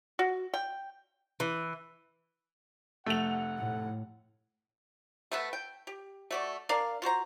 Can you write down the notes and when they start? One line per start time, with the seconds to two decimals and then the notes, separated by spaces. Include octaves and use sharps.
0.19 F#4
0.54 G5
1.40 E3
3.06 F1 A3 F#5 F7
3.58 A2
5.32 A3 B3 B4 E5
5.53 G5
5.87 G4
6.31 A3 F#4 D5
6.69 D4 A#4 D5 F5
7.02 F4 F#4 C5 A#5